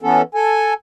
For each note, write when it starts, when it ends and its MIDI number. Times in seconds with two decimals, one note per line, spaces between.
0.02 0.22 52
0.02 0.22 59
0.02 0.22 61
0.02 0.22 69
0.35 0.74 69
0.35 0.74 80